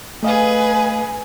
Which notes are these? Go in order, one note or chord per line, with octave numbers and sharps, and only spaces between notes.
A3 G#4 B4 D#5 F5 G#5